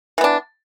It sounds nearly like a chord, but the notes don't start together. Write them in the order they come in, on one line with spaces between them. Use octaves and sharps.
E3 B3 D4